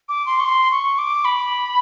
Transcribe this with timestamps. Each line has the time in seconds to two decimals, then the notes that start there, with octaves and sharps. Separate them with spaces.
0.09 D6
0.26 C6
0.40 C#6
0.45 C6
0.72 C#6
0.98 D6
1.25 B5